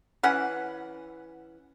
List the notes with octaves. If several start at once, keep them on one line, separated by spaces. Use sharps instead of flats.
E3 C#4 F#5